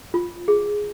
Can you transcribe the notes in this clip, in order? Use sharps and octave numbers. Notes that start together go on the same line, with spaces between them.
F4
G#4